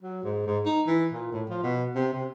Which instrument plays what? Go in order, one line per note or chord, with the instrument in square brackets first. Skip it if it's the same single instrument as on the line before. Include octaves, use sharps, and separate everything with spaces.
[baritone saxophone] F#3
G#2
G#2
D#4
E3
A#2
A2
F3
B2
C3
C3